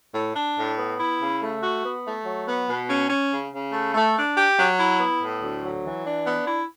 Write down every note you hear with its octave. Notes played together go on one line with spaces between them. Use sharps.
A2
D4
A2
B3
E4
C#3
A3
F#4
B3
A3
F#3
B3
B2
C#4
C#4
C#3
C#3
A3
A3
D4
G4
F#3
E4
B3
A2
D2
F#3
E3
D4
B3
E4